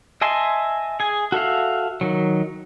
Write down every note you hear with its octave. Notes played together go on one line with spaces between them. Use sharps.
D#5 E5 G#5 A5 C6
G#4 G#5
F#4 A4 E5 F5
D#3 F#3